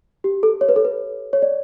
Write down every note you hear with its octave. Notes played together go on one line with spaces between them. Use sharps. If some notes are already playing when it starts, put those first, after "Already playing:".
G4
A4
C#5
B4
A4
B4
C#5
D5